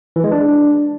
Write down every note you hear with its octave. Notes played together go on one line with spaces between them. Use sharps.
E3
G#3
D4